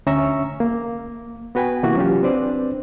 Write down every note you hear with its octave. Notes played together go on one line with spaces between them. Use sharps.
D2 C#4 E5 A#5 C#6 E6
A#3
B3 F#4 B4 G5 G#5
C3 E3 A#3 E4 F#4
F#3 C#4 F4 G4
C4 D4 B4 C5 D5